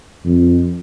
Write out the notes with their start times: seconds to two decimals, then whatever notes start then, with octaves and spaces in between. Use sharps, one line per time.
0.25 F2